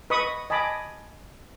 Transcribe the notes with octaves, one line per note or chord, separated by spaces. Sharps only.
B4 D#5 B5 C#6 D#6
D#5 G#5 A5 B5 D6 D#6